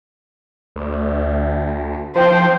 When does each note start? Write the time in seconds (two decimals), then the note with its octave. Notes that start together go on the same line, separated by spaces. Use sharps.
0.76 D2
2.15 F3 C5 G5